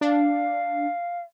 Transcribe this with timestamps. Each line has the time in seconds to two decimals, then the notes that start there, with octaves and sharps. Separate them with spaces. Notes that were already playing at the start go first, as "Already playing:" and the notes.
0.01 D4 F5